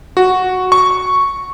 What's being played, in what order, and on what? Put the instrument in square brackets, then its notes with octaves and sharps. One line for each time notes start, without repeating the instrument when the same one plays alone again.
[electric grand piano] F#4
C#6